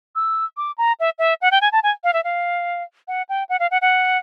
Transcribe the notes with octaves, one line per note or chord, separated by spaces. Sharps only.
E6
D6
A#5
E5
E5
F#5
G5
G#5
A5
G#5
F5
E5
F5
F#5
G5
F#5
F5
F#5
F#5